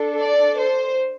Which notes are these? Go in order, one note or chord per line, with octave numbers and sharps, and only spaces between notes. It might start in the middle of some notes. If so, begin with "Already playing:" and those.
Already playing: D4 A4
D5
C5